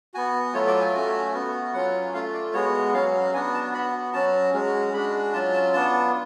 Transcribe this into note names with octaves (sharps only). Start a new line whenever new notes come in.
B3 F#4 G#5
F#3 A3 F4 C#5
D5
G#5
A3 C#4 F#4
B3 F#4
F#3 C#4 F4 F#5
A3 F4 F5
D5
G#3 B3 F#4 C#5
F#3 C#4 F#4 F5
B3 D4 F#4 G#5
A5
B3 F#4 B5
F#3 C#4 F#4 A5
G#3 C#4 F#4
G#3 D4 F#4 B5
F#3 C#4 F4 A5
A5
B3 D4 F4 A5